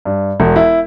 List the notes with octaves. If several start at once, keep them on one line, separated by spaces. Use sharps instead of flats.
G2
E1
E4